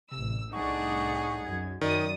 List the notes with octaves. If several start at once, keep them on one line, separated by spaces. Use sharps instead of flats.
A1 C3 E6
C2 A2 D4 D#4 G#4 F#5 C#6
C#6
F#2 G#6
F#2 D#3 D5 D#6